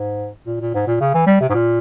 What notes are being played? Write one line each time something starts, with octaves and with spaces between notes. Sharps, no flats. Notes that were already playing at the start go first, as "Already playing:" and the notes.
Already playing: G#2
A#2
A#2
G#2
A#2
C#3
E3
G3
C3
G#2
A#2